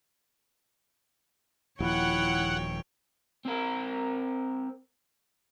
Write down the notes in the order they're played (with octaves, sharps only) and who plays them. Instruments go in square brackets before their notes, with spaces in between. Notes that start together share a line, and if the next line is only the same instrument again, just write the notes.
[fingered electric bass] D#1 F3 [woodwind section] E4 [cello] C#5 G5 [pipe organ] F#5
[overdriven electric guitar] C4 A#4